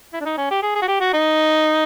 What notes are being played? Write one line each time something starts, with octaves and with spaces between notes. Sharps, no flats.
E4
D4
D#4
C#4
G4
G#4
G#4
F#4
G4
F#4
D#4